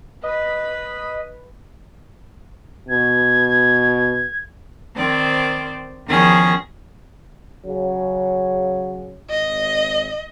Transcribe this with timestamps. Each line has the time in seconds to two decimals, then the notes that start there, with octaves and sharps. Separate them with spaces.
0.23 B4 D#5 B5
2.88 B2 G#6
4.95 D#3 C4 C5 D5
6.06 E2 D#3 F3 C#4 G#4 A#6
7.65 C#3 F#3
9.30 G#1 D#5